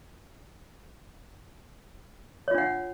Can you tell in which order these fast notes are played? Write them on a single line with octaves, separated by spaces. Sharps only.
C#5 F4 D4 F#5